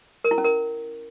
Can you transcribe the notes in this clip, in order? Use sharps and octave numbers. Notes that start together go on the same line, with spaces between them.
A#4
E4
C#4
A#4